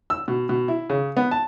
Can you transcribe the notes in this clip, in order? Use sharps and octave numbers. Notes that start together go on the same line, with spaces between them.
E6
B2
B2
E4
C#3
B3
A5